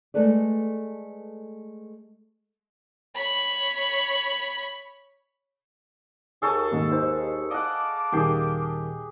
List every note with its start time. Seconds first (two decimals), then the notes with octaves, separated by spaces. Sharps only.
0.14 G#3 A3 A4 B4 D5
3.15 C#5 B5
6.42 D#2 G#4 A4 C#5
6.71 G#2 D#3 A#3
6.90 D#4 C5
7.51 D#5 F5 F#5 A5 D6
8.12 D#1 D#3 G4 G#4 C7